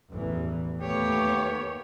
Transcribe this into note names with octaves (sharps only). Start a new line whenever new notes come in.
A1 E2 E3
D#2 A3 B3 G4 C#5